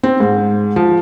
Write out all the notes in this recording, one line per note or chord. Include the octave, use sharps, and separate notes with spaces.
C4
G#2
F3